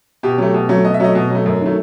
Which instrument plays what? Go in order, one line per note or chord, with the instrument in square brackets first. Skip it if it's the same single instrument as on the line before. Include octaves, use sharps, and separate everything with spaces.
[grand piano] B2 G4
F#3 A3
B2
F#3 A3
B2 D#5
E5
F#3 A3 D#5
B2
F#3 A3
F#2
D#3 F#3 A3